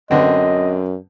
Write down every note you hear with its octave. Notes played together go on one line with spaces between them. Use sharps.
F#2 D3 B3 C4 D#5